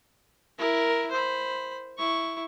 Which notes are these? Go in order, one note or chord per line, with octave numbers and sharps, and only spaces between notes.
E4 A#4
C5 B5
E4 C#6